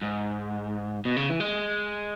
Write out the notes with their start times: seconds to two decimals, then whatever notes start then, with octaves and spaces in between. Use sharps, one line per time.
0.02 G#2
1.05 B2
1.16 C#3
1.29 E3
1.40 G#3